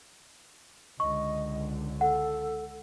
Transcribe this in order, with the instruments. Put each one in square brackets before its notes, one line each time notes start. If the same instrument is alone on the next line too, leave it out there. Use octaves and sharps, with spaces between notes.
[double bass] C#2 D3 [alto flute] D#5 [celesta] C#6
[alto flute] A4 [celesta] F#5